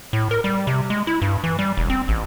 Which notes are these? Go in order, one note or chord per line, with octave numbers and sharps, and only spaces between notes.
A2
A#4
G3
C3
G#3
E4
G2
E3
G3
E1
C4
A1